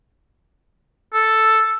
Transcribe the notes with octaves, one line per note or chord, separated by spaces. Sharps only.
A4